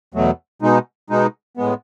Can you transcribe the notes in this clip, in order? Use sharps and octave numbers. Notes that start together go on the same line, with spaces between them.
E2 B2 F#3 A3
B2 G#3 D#4
B2 G#3 D#4
A2 G#3 B3